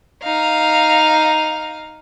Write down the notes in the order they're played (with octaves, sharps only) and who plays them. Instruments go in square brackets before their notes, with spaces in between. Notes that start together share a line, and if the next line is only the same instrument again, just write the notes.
[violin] D#4 F5